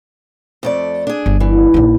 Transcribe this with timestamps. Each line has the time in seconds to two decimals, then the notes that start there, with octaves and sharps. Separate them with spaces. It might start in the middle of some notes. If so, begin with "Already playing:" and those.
0.63 F2 A3 D5
1.07 D4 G#4
1.26 G1
1.40 E3
1.74 A#1 D#4